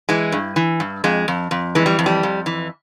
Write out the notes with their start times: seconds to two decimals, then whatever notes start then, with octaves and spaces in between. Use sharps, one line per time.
0.09 E3 G#3
0.32 G2
0.56 E3
0.80 G2
1.04 F2 G#3
1.28 F2
1.51 F2
1.75 E3 G#3
1.86 G3
1.99 F2
2.06 G3
2.23 F2
2.46 E3